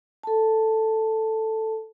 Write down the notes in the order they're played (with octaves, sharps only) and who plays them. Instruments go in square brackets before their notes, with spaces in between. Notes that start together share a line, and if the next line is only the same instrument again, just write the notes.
[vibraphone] A4 A5